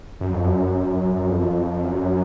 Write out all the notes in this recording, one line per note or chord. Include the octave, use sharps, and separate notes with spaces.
F#2
F2
F#2
F#2
F#2
F#2
F2
F#2